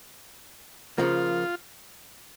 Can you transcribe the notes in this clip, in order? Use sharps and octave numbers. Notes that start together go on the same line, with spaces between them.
C#3 F3 A#3 F4